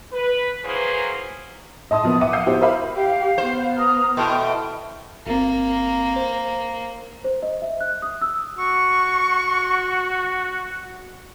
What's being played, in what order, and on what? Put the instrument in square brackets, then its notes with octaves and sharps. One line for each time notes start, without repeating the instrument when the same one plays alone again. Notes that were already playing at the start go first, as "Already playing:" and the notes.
[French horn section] B4
E3 F#3 A#3 G#4 B4 C5
[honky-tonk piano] D#5 A5 C6 D#6
B2 F3 A#3 B3
E5 F#5 G5 D6 D#7
F5 F#5 E6 G6 C7 D#7
B3 E4 F#4 G4 C5
A#4 C5 E5 F5 B5
[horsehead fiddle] G4 [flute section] F5
[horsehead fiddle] B3 [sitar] C5
[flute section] A#5 D#6 F6
[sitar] B2 [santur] A3 E4 C5 [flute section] G5
[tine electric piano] G1 C4 [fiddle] A#3
[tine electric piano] C5
[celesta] C5
D#5
E5
F#6
D#6
E6
[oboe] F#4 [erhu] C#6